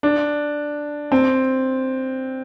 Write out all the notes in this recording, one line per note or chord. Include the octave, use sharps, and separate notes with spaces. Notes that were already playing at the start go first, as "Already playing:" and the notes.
D4
C4